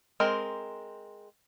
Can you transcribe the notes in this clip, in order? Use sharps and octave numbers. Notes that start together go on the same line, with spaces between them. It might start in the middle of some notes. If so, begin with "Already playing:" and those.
G#3 C4 A#4